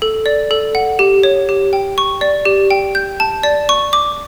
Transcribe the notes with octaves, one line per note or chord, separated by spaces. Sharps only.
A4
D5
A4
F#5
G4
C#5
G4
G5
C#6
D5
G4
G5
G6
A5
D5
C#6
D6